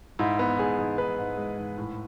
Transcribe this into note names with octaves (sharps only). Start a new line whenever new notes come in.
G#2 E4
B3
G#2 G#4
G#2
G#2 B4
G#2
G#3
G#2
A2